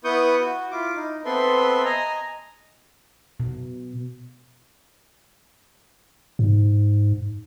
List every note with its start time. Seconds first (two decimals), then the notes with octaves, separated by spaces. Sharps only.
0.05 B3 E4 B4 C#6 D#6 G6
0.41 F#4
0.71 E4 F4 D6
0.95 D#4
1.25 B3 C4 A4 B4 E5 C6
1.85 D#5 G#5 A#5
3.40 B2
6.39 G#2